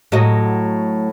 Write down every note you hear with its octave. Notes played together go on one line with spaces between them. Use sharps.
A2 F#3 D#5